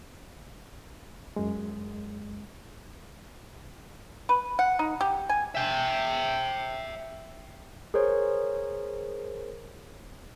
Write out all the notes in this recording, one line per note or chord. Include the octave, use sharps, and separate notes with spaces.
F#2 G#3
B4
F#5
D#4
G4
G#5
E5 G5
G#4 A#4 C5 C#5